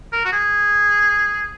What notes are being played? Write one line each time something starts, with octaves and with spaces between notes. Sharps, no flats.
A#4
F#4
G#4